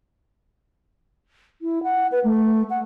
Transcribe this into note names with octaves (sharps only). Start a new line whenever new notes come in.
E4
F#5
B4
A3
F#5